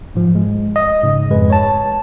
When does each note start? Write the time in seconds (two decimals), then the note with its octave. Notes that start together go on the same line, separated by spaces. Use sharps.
0.15 G#2 F3
0.35 G#3
0.76 D#5
1.03 G#2 C#3
1.30 F2 G#3 B4
1.50 C#5 A5